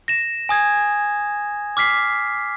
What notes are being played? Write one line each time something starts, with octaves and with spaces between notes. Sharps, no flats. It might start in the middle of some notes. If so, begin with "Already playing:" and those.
A#6 E7
G#5 D#6 G#6
D6 F6 B6 C7